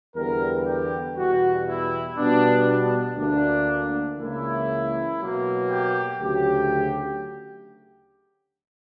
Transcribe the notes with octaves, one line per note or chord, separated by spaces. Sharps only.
E2 D3 G3 B3 A#4
G4
E2 B2 G3 F#4
E4
B2 G3 B3 D4
D4
D2 D3 A#3 D4
C#2 C#3 E3 A#3 E4
B2 F#3 A#3
G4
D2 C#3 F#3 G4